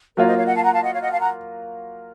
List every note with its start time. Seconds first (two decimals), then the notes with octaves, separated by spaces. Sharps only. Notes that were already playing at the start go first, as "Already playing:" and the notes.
0.17 F#3 A#3 F4 A#4 C#5
0.26 C5 D#5
0.36 C#5 F5
0.45 D#5 F#5
0.55 F5 A5
0.64 F#5 A#5
0.73 F5 A5
0.82 D#5 F#5
0.92 C#5 F5
1.01 D#5 F#5
1.12 F5 A5
1.20 F#5 A#5